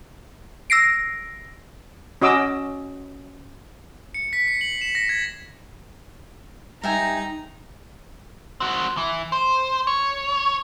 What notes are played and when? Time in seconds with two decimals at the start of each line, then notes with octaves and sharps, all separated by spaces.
0.70 E6 A#6 C7 D7
2.22 C#4 F#4 D#5 D6 E6
4.14 C#7
4.33 B6
4.48 C7
4.61 F#7
4.81 E7
4.95 A#6
5.09 G#6
6.83 G3 D#4 E5 G5 G#5 A#5
8.60 C4 F#4
8.97 E3
9.32 C5
9.87 C#5